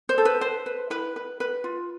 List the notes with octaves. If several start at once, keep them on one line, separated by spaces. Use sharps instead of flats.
C5
A4
B4
B4 C5
B4
E4 B4
B4
B4
F4